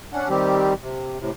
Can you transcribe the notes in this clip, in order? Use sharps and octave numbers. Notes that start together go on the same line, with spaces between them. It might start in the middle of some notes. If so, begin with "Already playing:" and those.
C#4 D4 F#5
D#3 G3 C4 G4
C3
A2 C3